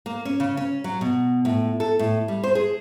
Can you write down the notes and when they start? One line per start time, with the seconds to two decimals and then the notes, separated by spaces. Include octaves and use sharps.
0.06 A#3
0.25 C#4
0.40 C#3
0.57 C#4
0.84 F#3
1.01 B2
1.45 A2
1.80 A4
1.99 A2
2.28 G3
2.44 C5
2.55 G#4